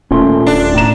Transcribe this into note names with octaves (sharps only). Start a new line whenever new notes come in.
D#1 A#2 A3 C#4 C6
D4
A2 A#5 E7